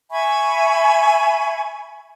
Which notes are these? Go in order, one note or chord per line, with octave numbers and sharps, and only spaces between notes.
E5 G#5 B5 C#6